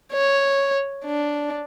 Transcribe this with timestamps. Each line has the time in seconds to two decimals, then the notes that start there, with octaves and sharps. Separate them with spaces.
0.12 C#5
1.05 D4